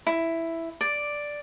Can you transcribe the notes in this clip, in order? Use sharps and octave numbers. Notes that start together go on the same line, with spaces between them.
E4
D5